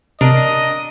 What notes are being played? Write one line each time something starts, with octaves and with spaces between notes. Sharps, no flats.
C3 D4 A#4 D#5